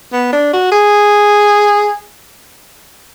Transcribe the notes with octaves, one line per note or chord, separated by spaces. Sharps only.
B3
D4
F#4
G#4